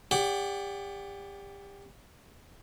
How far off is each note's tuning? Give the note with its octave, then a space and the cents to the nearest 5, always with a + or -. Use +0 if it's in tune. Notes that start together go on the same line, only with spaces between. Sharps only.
G4 +30 D5 -25 F#5 +15